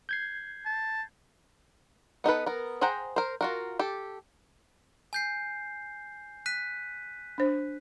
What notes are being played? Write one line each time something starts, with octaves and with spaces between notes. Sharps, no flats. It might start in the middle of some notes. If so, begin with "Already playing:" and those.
G6 G#6 C7
A5
B3 D#4 A4 B4
B3 A#4
G#4 C5 F#5 G5 A#5
A#4 C5
F4 F#4 A#4
G4 A4
G#5 G6 C7
F#6 B6 D#7
D4 C5